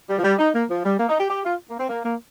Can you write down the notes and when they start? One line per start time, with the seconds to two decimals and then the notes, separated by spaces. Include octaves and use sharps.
0.10 G3
0.19 F3
0.24 G3
0.39 D#4
0.54 A#3
0.70 F3
0.85 G3
0.99 A#3
1.09 D#4
1.19 G4
1.30 G4
1.45 F4
1.70 A#3
1.79 C4
1.89 A#3
2.04 A#3